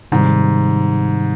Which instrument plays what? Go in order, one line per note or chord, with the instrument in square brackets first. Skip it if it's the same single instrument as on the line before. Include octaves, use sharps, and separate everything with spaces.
[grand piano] G#2 [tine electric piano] C3 D#3 G3